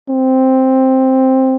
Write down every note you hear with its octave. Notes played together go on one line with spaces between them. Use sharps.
C4